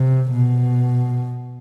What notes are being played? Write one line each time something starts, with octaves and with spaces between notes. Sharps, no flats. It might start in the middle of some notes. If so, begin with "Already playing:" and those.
Already playing: C3
B2